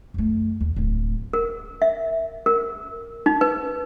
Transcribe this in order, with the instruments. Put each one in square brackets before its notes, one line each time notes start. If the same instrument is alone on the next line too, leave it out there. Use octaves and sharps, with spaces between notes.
[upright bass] F#2 A3
D#2
D1 D#4
[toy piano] A#4
E5
A#4
D#4
B4